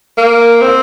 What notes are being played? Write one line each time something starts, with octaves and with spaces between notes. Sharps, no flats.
A#3
C4